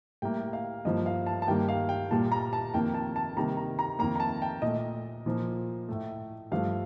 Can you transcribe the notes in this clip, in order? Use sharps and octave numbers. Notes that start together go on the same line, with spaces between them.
A2 G3 A#3 G5
F5
G2 F3 A#3 D#5
F5
A5
A5
G2 D#3 G3 A#3 G5
F5
G5
A#2 G3 A#3 A5
A#5
A5
F2 D#3 A#3 G5
A5
A5
C3 D#3 G3 A#3 A#5
A#5
A#5
F2 D#3 A#3 A#5
A#5
A5
G5
A#2 A3 D#5
A#2 F3 A#3
A2 A3
G2 F3 A3 F5